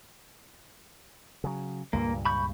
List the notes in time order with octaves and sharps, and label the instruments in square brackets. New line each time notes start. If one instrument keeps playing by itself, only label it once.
[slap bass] C#3 F#3
[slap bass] C#2 G2 A#2 [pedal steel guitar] A#3
[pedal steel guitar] B5 C#6 G6